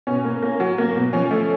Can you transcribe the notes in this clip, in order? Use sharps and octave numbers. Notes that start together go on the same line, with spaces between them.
B2 C#4
A#3
A#3
F#3
A#3
B2
F3 C#4
A3